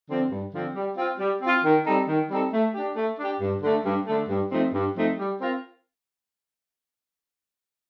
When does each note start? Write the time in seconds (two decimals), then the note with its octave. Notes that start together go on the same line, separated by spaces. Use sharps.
0.09 D3 F3 C4
0.31 G2
0.53 D3 F3 C4
0.75 G3
0.97 C4 F4
1.19 G3
1.42 C4 F4
1.64 D#3
1.86 G3 C4 D#4 A4
2.08 D#3
2.30 G3 C4 D#4 A4
2.52 A3
2.74 D4 G4
2.96 A3
3.18 D4 G4
3.41 G2
3.62 D3 A3
3.84 G2
4.07 D3 A3
4.29 G2
4.51 F3 A3 C4 D#4
4.73 G2
4.95 F3 A3 C4 D#4
5.17 G3
5.39 C4 F4 A#4